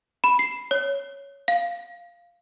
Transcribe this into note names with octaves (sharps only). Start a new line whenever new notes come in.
B5
C7
C#5
F5